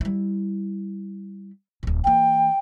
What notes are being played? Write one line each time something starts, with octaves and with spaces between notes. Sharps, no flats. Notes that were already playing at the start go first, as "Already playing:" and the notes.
G3 E4
D1 E2
E3 A#3 G5